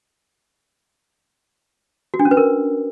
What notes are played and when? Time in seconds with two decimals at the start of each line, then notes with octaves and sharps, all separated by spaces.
2.14 F#4
2.19 D4
2.25 C#4
2.31 B4
2.37 A#4